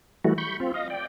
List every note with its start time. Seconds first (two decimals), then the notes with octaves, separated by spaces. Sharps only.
0.25 E3 G3 A3 F#4
0.38 B5 C#6 G6
0.60 C4 F4
0.74 D#5 F5 A#6
0.90 D5 G5